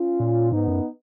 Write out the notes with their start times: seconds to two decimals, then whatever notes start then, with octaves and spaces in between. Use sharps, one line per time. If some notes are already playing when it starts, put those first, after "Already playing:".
Already playing: C#4 F4
0.20 A#2
0.52 G#2 B3 D#4
0.68 F#2